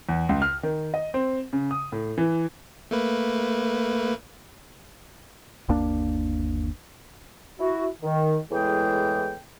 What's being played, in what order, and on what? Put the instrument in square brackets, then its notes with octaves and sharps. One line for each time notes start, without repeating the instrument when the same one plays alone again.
[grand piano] E2
C#2
F6
D#3
D#5
C4
C#3
D#6
A2
E3
[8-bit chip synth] A3 A#3 B4
[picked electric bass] G1 D#2 A#3 D4
[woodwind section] E4 F#4
D#3
E2 A2 E3 G#3 G#4 G5